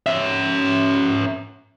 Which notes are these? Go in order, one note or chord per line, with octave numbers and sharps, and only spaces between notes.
C#4 E5